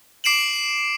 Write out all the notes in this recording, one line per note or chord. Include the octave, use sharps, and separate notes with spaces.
D6 C7 D7 E7 F#7